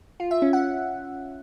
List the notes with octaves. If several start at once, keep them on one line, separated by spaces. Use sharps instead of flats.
F4
E5
C#4
F#5